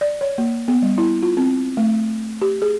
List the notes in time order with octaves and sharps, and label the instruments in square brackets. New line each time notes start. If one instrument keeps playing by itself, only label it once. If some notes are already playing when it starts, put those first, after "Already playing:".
[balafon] D5
C#5
A#3
B3
G3
E4
F4
C4
A3
G4
G#4